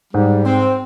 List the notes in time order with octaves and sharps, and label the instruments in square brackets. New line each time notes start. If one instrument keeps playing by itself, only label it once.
[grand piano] G#2 [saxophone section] G3
[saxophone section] C4